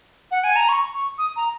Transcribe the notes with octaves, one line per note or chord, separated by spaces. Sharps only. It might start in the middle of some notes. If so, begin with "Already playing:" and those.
F#5
G#5
A#5
C#6
C#6
D#6
A#5